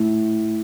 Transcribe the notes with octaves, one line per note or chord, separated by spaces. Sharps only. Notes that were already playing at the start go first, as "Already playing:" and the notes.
Already playing: A2